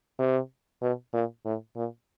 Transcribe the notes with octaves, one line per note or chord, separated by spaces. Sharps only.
C3
B2
A#2
A2
A#2